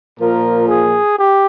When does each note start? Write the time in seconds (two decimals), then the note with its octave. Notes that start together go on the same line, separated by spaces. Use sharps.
0.18 A#2 F3 A#4
0.68 G#4
1.18 G4